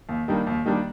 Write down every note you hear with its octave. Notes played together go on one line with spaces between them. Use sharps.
D#2
D#3 G3 A#3 D4
D#2
D#3 G3 A#3 D4